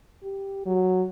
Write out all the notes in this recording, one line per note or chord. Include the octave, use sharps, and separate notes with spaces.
G4
F#3